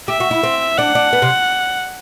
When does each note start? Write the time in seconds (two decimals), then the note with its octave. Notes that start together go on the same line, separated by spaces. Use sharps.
0.08 G4 E5
0.20 F#4
0.31 E4
0.43 C4
0.78 D4 F#5
0.95 D4
1.13 B3
1.22 C3